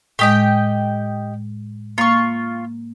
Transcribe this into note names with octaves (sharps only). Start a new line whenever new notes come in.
A2 G#3 G4 D#5 G5
A#3 F4 C#6